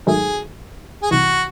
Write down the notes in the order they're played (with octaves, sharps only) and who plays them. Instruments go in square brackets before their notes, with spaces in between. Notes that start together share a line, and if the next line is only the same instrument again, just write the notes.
[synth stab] G#2 D#3 F#3 A3 [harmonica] G#4
[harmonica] G#4
[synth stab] C2 C3 E3 [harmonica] F#4